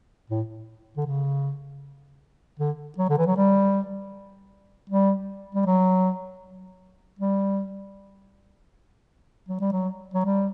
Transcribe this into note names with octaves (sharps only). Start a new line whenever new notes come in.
A2
D3
C#3
D3
F#3
D3
E3
F#3
G3
G3
G3
F#3
G3
F#3
G3
F#3
F#3
G3